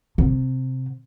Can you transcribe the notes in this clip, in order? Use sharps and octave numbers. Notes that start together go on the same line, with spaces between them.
C3